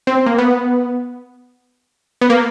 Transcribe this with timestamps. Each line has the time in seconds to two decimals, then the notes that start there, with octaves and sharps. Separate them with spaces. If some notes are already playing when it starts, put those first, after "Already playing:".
0.07 C4
0.26 A#3
0.38 B3
2.21 B3
2.30 A#3